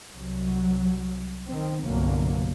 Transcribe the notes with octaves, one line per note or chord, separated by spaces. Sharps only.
C2 F#3
D#3 C4
G1 C2 B2 D3 F#3 A#3